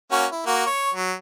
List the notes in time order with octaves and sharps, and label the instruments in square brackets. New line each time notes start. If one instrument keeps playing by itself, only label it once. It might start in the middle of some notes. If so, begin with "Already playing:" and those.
[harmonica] A#3 C#4 F#4
E4
A#3 F#4
C#5
F#3